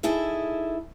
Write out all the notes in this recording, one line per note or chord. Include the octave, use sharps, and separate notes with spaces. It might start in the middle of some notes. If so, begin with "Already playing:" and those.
D#4 E4 G#4 A4